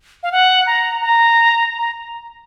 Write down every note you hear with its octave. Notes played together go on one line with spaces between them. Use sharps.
F5
F#5
A#5
A#5
A#5